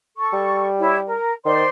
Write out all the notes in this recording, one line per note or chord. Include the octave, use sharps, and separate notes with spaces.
A4 C#6
G3
E4 G4 C#5
A#4
D#3 C5 D5 C6